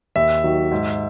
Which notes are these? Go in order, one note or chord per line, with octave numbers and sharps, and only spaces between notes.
D#2 E5
D#3 F#3
G#2